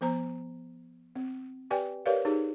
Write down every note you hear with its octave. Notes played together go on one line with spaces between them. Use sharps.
F3 B3 C5 A#5
C4
G4 B4 D5 G5 G#5
G4 A#4 B4 C#5 D5 F5
D#4 G4 G#4